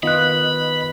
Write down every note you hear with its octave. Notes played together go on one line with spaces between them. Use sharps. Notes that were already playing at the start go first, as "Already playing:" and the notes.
D#3 B3 F4 D#5 B5 F#6